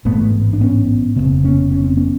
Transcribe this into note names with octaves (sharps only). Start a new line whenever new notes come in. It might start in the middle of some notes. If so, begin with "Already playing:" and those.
A1 G#2 A3 B3
D4
B3 C#4
F1 D#2 C#3 A#3 C4
B3 C#4
C#4
C4
B3 C#4